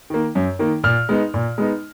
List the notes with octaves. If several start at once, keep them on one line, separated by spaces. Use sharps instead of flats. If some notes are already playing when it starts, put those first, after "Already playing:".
D#3 A#3
F#2
D#3 A#3
A#2 F6
G#3 B3 D#4
A#2
G#3 B3 D#4